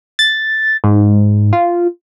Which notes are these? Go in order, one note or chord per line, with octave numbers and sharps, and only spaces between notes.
A6
G#2
F4